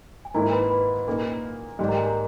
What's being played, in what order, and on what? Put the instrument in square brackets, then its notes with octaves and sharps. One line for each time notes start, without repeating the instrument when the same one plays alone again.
[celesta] G#5
[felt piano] G#2 D#3 A#3 E4 [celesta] A#4 A#5
[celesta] B4 B5
B4 B5
[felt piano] A#2 A#3 D#4
G#2 D#3 G3
[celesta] A#4 A#5
G#4 G#5
A#4 A#5